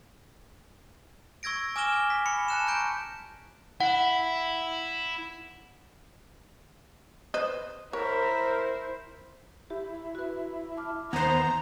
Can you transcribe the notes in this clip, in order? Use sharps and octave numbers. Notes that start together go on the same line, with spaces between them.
C#6 E6 G#6 A#6 D7
G#5 D6 F6 A#6 E7 G7
B6
B5 C#7
A5 F#6 E7
A#5 C#6 G6 D7
E4 F#5
B4 C5 D#5
E4 A#4 C5 C#5
E4 G4
F#4 B4
A5 D6 F6
D#2 E3 B3 C5 A#5